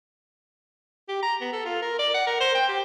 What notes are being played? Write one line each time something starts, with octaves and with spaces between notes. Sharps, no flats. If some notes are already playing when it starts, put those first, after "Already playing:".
G4
A#5
B3
A4
F4
A#4
D5
F#5
A#4
C5
G5
G4